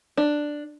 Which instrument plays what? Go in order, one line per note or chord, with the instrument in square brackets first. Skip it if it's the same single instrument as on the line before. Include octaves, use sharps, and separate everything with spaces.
[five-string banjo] D4